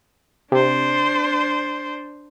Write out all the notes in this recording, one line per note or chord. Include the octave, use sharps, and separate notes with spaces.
C3 D4 C5